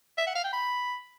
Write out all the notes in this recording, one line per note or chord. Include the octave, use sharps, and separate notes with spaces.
E5
F#5
F5
G5
B5